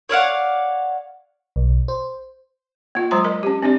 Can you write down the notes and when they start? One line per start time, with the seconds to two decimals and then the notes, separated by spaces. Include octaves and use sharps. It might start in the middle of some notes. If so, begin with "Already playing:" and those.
0.09 C#5 D5 F5 F#5
1.56 B1
1.88 C5
2.95 A#3 F4
3.11 F#3 G#3 C5 A#5 C6
3.24 A#4 D#5
3.43 C#4 G4
3.62 C4 D4 G4 D5